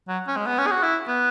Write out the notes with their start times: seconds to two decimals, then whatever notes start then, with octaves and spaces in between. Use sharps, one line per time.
0.08 F#3
0.28 C#4
0.36 G#3
0.46 B3
0.58 C#4
0.66 G#4
0.71 F#4
0.83 E4
1.08 B3